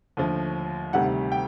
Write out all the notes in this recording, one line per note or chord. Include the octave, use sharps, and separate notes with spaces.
D#2 D3 F3 A3
D2 C3 D#3 G3 F#5
G5